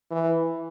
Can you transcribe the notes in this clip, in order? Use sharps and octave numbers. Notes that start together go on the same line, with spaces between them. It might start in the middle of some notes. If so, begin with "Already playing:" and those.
E3